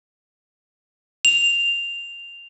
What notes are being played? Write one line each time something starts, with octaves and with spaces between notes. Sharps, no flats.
F7